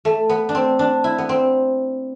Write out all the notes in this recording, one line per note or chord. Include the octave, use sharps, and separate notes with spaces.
A3
B3
D4
C4
D4
E4
B3
C4